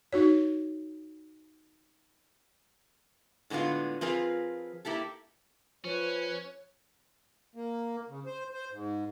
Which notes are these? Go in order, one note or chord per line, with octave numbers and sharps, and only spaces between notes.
D#4 F#4 C#5
A2 D3 G#3 B3 F4
F3 C4 F4 G#4 A#4 B4
A#3 E4 G4 A4
F3 C#4 B4 C#5
A#3
C#3
C5
C5
G#2